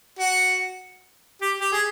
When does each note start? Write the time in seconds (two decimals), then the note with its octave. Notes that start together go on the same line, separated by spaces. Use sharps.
0.19 F#4
1.42 G4
1.60 G4
1.72 G#4